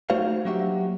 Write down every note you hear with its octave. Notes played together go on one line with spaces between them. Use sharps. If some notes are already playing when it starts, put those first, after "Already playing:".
A3 D#4 F#4 C5 C#5 F5
F#3 A#3 D4 F#4 G4 E5